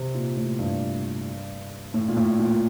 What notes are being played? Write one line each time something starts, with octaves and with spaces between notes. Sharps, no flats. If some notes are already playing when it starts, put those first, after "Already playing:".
Already playing: C3
A#2
A2
G2
A2
A#2
A2
A#2